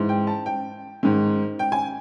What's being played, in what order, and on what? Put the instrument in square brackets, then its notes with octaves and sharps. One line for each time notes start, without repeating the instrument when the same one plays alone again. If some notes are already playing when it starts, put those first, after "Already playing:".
Already playing: [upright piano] G#2 E3
G5
A5
G5
G#2 D#3
G5
G#5